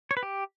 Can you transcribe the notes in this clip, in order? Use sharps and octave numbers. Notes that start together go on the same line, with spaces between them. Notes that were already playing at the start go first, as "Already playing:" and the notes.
C#5
B4
G4